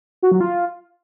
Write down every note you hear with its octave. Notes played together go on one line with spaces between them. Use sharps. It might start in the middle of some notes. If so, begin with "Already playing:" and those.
F#4
F#3
F4